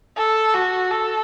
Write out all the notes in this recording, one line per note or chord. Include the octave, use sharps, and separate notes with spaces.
A4
F#4
A4